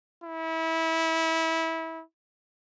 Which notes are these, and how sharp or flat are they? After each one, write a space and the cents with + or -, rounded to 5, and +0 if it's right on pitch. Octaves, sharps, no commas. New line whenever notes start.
E4 -25